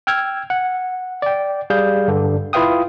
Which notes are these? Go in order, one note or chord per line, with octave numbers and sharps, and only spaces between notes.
G5 E6 F6 G#6
F#5
D5 G5
G3 G#4 F5 G6
G2 D3
E4 F4 B4 F5 G5 D#6